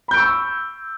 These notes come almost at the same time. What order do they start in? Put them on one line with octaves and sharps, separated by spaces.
B5 G6 D7 C#6 E6